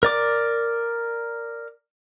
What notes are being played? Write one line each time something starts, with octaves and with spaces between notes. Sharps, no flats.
A#4 D5 D6